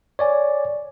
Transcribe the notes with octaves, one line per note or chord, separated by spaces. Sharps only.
C#5 D5 G#5